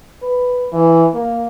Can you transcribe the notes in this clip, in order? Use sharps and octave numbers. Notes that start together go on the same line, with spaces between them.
B4
E3
A#3